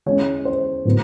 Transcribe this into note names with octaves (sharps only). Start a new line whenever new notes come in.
E3 G#3 C#4 C#5
C5
A2 F#3 B3